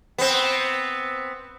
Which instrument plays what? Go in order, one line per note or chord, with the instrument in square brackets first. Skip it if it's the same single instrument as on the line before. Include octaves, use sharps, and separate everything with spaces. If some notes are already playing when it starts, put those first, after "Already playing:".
[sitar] B3 C4